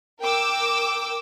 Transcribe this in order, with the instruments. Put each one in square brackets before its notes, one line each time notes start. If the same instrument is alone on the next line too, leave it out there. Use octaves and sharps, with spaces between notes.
[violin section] A#4 G5 D6 E6